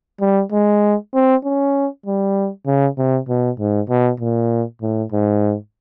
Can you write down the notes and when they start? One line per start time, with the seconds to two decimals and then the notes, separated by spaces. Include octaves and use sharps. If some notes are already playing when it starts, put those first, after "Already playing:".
0.21 G3
0.52 G#3
1.14 C4
1.44 C#4
2.06 G3
2.66 C#3
2.98 C3
3.29 B2
3.60 G#2
3.89 B2
4.20 A#2
4.82 A2
5.12 G#2